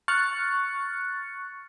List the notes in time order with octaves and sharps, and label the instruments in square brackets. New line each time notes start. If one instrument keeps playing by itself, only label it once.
[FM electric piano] C#6 F6 F#6 A6 C#7